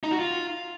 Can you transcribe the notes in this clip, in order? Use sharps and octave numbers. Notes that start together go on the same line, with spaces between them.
D#4
F#4
F4